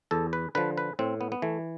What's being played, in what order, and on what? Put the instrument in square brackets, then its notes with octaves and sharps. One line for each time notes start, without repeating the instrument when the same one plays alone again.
[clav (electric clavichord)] E2 A4
B4
D3 F3 B4
B4
A2 C4
B3
B3
E3 A3